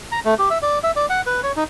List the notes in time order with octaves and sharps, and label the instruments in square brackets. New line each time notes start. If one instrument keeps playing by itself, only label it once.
[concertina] A#5
A3
G4
E5
D5
E5
D5
F#5
B4
C#5
D#4